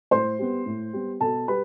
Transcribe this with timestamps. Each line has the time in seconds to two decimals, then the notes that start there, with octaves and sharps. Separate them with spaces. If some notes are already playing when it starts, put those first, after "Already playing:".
0.11 A2 C5 C6
0.39 G3 B3
0.66 A2
0.93 G3 B3
1.21 B2 A4 A5
1.48 G3 B4 B5